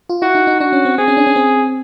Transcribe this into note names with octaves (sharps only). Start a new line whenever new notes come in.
F4
E4 F#4
D#4
D#4
D4 F#4
C#4
C4
C4 G#4
C#4
D4
C#4
C4